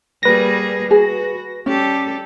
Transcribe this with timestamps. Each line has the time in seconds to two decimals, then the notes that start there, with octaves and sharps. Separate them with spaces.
0.23 G3 A#3 G#4 B4 A#6
0.91 F#4 G#4
1.66 G3 C#4 G4 A4